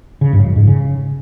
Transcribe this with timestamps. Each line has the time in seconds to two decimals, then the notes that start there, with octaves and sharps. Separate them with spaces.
0.21 C#3
0.33 G2
0.44 F2
0.56 G#2
0.67 C#3